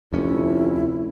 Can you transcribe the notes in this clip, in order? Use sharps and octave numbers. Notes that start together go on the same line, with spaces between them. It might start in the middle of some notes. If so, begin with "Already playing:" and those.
F1 D2 C#4 E4